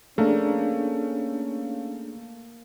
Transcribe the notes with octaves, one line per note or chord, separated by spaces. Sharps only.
A3 A#3 C#4 D4 G#4